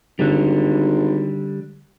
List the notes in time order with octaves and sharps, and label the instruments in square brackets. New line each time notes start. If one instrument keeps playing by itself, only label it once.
[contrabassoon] G#1 [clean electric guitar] D3 G3